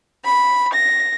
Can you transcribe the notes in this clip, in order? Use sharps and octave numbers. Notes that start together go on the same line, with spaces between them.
B5
A#6